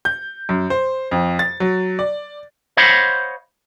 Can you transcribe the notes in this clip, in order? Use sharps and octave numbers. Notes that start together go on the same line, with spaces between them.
G6
F#2
C5
F2
A6
F#3
D5
C5 C#5 D#5 F5 F#5 B5